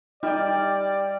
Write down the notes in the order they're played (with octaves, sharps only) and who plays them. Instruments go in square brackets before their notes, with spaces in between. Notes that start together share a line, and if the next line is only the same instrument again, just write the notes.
[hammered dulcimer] G3 [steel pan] D#4 G5 [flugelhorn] D5